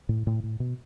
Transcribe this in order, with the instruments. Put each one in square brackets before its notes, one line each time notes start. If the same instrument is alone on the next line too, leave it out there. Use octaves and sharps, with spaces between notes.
[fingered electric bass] A2
A2
A2
B2